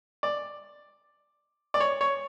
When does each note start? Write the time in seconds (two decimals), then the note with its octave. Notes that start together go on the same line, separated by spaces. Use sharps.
0.23 D5
1.74 D5
1.80 C#5
2.01 C#5